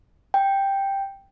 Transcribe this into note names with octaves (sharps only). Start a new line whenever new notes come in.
G5